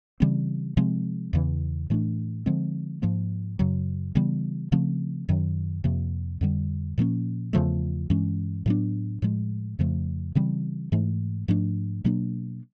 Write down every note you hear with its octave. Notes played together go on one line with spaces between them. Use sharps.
C#3 E3 G3 C4
C3 F3 G#3 C4
E2 C#3 E3
A2 E3 A3 D4
D3 F3 G#3 C4
G#2 F3 A#3
F#2 C#3 F#3
C#3 E3 G3 B3
C#3 F3 A3 C4
F#2 D#3 F#3
F2 C3 F3 A#3
F2 D3 G3
A#2 F3 A#3 C#4
E2 C#3 F3 A3
G2 E3 G#3 C#4
A2 F#3 B3 D4
A2 F3 G#3
F2 C#3 F3 A3
C#3 E3 G3 C4
G#2 E3 A3
G#2 F3 A3 D4
B2 F#3 A#3 D4